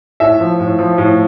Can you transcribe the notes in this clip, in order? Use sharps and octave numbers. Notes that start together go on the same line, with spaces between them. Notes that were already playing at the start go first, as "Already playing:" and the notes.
A2 E5
F3
A2
F3
A2